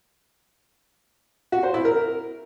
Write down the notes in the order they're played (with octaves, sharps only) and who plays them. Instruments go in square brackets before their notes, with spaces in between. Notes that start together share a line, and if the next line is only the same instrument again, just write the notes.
[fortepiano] F#4
C5
E4
A#4